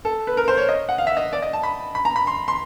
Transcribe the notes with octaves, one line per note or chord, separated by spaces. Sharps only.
A4
B4
A#4
C5
C#5
D#5
F#5
F5
E5
D#5
D5
D#5
A5
B5
B5
A#5
B5
C6
C6